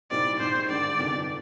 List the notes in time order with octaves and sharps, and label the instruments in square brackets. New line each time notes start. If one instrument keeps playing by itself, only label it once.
[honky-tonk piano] C2 A#2 G3 C4 D#4 [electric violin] D5
[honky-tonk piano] A#1 G#2 D#3 [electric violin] C5
[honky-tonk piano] G#1 G2 D3 G#3 [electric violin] D5
[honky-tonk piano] G1 F2 C3 D#3